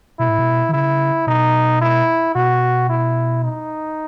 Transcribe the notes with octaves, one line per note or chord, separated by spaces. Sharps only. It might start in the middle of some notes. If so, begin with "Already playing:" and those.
B2 E4
A2
B2
D#3
C#3 E4
B2 D#4
E4
B2 F#4
E4
D#4